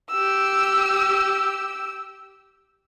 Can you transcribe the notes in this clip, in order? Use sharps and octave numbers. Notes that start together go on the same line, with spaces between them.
G4 E6